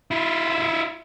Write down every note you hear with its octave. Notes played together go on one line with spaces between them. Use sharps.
E4 F4